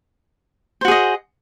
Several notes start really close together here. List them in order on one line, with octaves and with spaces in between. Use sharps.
C5 F#4 G#4 D#5